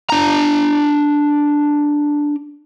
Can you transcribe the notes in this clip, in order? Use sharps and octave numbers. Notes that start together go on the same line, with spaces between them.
D4 A#5